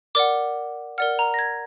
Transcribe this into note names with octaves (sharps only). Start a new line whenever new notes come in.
A#4 D5 F#5 D6
A#4 D5 F#5 F6
A#5
A#6
G#6